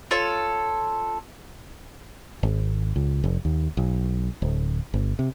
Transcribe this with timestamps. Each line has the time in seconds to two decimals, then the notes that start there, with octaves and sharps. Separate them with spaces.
0.11 F4 A4 C#5
2.43 G#1
2.96 C#2
3.24 F1
3.45 D#2
3.77 B1
4.42 D1
4.94 G1
5.19 C3